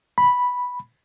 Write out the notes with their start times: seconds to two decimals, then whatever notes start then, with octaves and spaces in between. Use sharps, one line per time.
0.18 B5